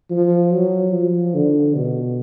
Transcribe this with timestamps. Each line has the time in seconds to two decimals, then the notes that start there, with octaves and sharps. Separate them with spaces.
0.10 F3
0.52 F#3
0.92 F3
1.34 D3
1.75 B2